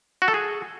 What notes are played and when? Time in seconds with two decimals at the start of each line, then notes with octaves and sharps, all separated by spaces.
0.22 F#4
0.28 A4
0.34 G#4